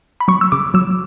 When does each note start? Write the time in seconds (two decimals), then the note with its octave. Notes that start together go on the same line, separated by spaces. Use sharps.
0.20 B5
0.28 F#3 C#6
0.41 E6
0.52 C#3 D6
0.74 F#3 E6